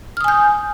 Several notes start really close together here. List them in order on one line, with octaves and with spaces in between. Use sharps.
F6 D#6 G#5 G6